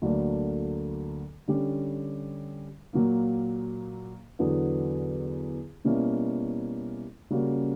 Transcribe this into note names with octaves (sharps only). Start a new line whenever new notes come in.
D2 D3 F#3 A#3 D4
D3 G3 C#4 G4
A#2 F#3 A#3
E2 D3 F#3 B3
B2 G3 A#3 C#4 E4
C#3 G3 A#3 C#4 F#4